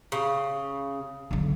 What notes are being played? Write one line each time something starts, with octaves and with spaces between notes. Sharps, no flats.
C#3
B1 D3